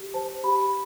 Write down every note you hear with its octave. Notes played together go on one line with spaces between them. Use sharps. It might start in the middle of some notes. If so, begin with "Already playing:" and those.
Already playing: G4
C5 A5
G4 B5